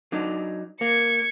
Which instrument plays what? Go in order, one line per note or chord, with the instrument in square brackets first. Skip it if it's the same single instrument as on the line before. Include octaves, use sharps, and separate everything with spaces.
[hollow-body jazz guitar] F#3 D4 D#4
[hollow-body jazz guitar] A#3 [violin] G#6 C#7